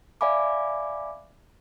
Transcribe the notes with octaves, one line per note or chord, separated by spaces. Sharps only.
D5 E5 F5 G#5 B5 D6